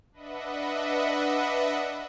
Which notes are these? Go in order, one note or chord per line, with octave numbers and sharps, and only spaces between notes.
D4 B4 D#5 E5 F#5